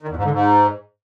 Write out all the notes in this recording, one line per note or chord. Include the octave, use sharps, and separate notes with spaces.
D#3
E2
G#2
D3
G#2